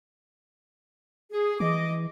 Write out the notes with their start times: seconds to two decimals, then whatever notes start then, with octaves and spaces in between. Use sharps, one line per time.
1.33 G#4
1.60 E3 D#5 D6